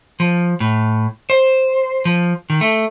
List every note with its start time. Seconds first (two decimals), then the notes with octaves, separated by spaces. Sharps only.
0.20 F3
0.60 A2
1.30 C5
2.05 F3
2.50 D#3
2.61 A3